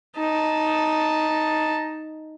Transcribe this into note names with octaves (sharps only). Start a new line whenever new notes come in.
D#4 A5